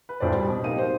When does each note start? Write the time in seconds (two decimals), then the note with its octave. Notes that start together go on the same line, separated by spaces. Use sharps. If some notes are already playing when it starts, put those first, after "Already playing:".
0.09 B4
0.20 G#1 D2 A2 C5 D5
0.34 G3
0.48 B2
0.63 D1 A#3 D#4 G4 D#7
0.78 C5